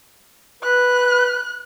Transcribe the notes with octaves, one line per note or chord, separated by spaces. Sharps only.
B4 F#6